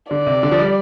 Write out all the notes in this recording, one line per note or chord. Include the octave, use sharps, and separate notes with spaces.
D3 D5
C3
D3
F3
G3